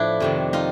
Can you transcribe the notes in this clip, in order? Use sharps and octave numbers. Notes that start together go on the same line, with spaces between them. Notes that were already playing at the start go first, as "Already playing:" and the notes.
Already playing: A2 F3 D4 E4
F2 C3 D#3
D#4 F4